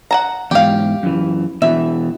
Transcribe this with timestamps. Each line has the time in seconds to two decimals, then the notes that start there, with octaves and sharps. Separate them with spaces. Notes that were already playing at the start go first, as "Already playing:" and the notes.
0.11 F#5 A5 A#5
0.51 E2 G#2 G4 F5
1.03 F#2 E3
1.62 B2 E3 E5